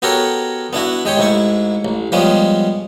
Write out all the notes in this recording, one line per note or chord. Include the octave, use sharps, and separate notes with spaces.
B3 F#4 G4 A4 A#4 C#5
B3 D4 E4 F#4
G#3 G4 C#5
A1 G#2 E4 C#6
A1
F3 G3 G#3 B3 C#4